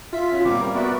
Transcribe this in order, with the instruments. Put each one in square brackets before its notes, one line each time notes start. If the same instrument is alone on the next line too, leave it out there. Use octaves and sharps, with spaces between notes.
[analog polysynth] F4 B6 [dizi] E5
[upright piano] C#4 F#4
[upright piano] C3 A#3 [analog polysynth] G3 [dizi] D6
[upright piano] A#4
[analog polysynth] B3 F#4 D5 [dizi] E5